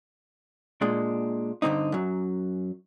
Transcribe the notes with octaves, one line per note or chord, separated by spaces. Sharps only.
A#2 G#3 D4
G2 D3 C4 D#4
F#2 F#3